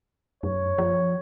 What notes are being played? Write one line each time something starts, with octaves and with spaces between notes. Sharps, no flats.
F#2 C#5
F3